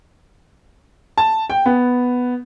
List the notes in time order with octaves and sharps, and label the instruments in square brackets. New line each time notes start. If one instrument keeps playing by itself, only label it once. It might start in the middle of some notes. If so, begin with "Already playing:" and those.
[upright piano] A5
G5
B3